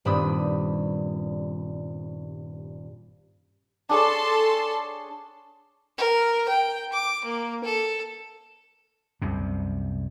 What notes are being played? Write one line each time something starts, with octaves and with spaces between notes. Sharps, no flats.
D#1 G2 C4 D4 B5 D#6
D4 G#4 A4 C#5 A5 C6
A#4
G5
D6
A#3
A4
C2 F#2 C3